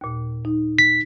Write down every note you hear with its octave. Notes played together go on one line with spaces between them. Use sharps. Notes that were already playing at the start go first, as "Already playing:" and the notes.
D#2 A#2
D#4
B6